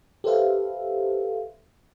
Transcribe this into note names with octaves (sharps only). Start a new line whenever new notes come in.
G4 A4 B4 C5 E5 F5